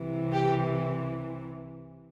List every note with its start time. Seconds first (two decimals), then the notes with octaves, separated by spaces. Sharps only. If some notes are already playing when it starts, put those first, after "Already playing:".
Already playing: C2 C3 E3
0.32 G4